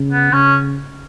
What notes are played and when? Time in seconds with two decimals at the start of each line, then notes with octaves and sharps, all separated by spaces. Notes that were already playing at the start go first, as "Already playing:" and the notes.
Already playing: C#3
0.12 B3
0.33 C#3 C#4